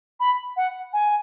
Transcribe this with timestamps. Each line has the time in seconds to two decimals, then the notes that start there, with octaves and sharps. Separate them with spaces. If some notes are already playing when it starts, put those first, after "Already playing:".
0.20 B5
0.57 F#5
0.93 G#5